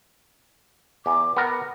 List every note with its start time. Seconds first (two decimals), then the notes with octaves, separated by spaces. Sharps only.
1.06 E2 D6
1.37 B3 A#4 F#5